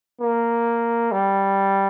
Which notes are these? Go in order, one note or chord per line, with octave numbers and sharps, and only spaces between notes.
A#3
G3